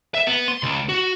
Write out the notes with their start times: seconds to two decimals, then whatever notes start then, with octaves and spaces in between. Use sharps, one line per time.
0.14 E5
0.27 B3
0.48 C6
0.63 C#2
0.89 F#4